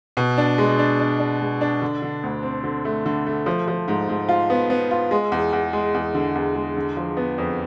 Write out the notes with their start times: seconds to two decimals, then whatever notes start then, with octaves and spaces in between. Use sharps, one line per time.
0.17 B2
0.37 D4
0.58 G#3
0.79 D4
0.99 D4
1.19 D4
1.40 G#3
1.61 D4
1.82 D3
2.02 D3
2.23 D2
2.43 C4
2.64 D3
2.85 A3
3.06 D3
3.26 A3
3.46 F3
3.68 F3
3.88 G#2
4.09 G#2
4.29 F4
4.50 B3
4.70 B3
4.91 F4
5.11 G#3
5.32 E2
5.53 E2
5.73 G#3
5.94 E2
6.15 D3
6.35 E2
6.55 G#3
6.77 D3
6.97 F3
7.17 B3
7.38 F2